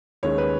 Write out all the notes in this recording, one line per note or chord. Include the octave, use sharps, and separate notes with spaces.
D#2 D#3 G#3 C#4 C#5
B4